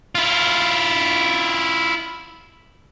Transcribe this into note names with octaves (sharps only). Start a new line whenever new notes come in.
E4 F4